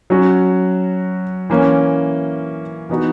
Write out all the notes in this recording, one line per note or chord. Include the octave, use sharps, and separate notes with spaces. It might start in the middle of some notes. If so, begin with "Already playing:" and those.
F#3 C#4 F#4
E3 A#3 C#4
E3 B3 D#4 F#4